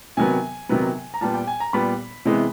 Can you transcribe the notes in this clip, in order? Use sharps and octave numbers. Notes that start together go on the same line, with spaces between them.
C3 D#3 F#3 B3 G#5
C3 D#3 F#3 B3
A#5
A#2 G3 B3 A5
G5
G#5
A#5
A#2 G3 B3 B5
C3 E3 G#3 B3